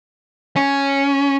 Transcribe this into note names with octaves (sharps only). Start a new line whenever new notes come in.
C#4